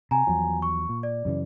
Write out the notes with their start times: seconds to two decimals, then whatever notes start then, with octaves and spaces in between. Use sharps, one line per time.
0.11 C3 G#5 A#5
0.27 E2 F3 F#3
0.62 C#6
0.89 A#2
1.03 D5
1.25 F#2 C#3 E3